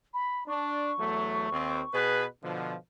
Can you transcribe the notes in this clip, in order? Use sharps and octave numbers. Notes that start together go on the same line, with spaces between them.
B5
D4 C#6
E2 F#3 A3
D#2 C4
B2 G#4 B4
B2 D3 F3